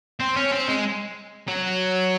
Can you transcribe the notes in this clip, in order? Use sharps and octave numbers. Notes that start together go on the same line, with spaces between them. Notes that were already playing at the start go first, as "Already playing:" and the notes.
C4
C#4
C4
G#3
F#3